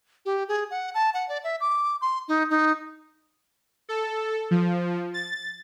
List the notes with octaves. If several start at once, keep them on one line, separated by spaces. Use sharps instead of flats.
G4
G#4
F#5
A5
F#5
D5
E5
D6
C6
D#4
D#4
A4
F3
A6